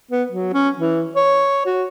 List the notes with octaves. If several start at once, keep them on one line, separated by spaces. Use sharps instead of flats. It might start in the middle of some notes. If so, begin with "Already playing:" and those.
B3
F#3
C#4
E3
C#5
F#4